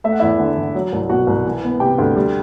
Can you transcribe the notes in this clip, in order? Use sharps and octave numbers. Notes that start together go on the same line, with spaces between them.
A3 E5
F#5
E2 E4 E5
D3
E2
F#3
C2
B2 F#4 F#5
C2
E3
B3
C3 G4 G5
D2
G3